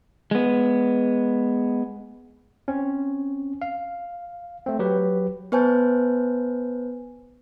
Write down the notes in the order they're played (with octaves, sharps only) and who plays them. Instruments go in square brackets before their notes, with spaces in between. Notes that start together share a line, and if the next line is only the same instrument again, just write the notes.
[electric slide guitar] G#3 B3
[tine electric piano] C4 C#4
F5
A3 C4
F#3 G4 B4
[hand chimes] B3 B4 C5 G#5 A5 G6